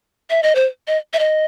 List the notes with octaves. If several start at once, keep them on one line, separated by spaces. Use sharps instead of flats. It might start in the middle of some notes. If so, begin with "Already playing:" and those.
E5
D#5
C5
D#5
E5
D#5